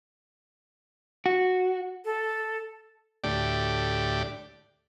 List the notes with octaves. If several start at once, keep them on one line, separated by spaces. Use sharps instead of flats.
F#4
A4
D2 A2 G4 D5